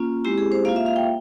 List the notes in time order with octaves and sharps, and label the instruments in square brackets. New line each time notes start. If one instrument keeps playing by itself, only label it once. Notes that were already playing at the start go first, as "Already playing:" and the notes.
Already playing: [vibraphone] A#3 C#4 F4
G#3 C4 E4 G4
G#4
C5
A#3 F4 F5
E5
F5
G5